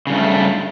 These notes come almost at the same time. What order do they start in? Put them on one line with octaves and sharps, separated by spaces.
C#3 G2 A3